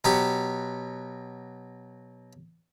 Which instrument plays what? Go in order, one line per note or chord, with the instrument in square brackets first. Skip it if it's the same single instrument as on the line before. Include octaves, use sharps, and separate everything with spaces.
[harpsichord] B2 F#3 F#4 G4